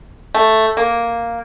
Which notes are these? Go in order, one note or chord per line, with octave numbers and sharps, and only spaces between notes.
A3
A#3